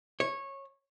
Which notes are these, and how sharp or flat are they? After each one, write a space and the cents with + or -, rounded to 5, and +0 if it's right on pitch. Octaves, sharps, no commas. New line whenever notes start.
C#5 -15